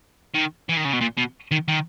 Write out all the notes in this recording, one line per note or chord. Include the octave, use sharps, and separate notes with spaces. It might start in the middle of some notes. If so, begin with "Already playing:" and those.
D#3
E3
D#3
C#3
B2
A#2
B2
D#3
D#3